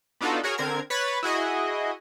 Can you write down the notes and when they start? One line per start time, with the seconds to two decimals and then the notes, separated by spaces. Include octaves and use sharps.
0.21 B3 D4 D#4 F4 F#4 A4
0.43 F#4 G#4 A#4 C#5
0.58 D3 C4 A#4 G#6
0.90 B4 C#5 B5 A6 B6
1.23 E4 F#4 G#4 D#5